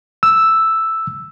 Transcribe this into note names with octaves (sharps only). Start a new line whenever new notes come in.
E6